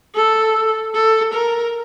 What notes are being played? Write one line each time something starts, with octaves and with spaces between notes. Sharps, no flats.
A4
A4
A#4